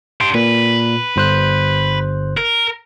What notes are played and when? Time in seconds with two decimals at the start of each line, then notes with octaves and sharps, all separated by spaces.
0.21 D4 G4 C6
0.34 A#2 B4
1.16 G1 C5 F#6
2.37 A#4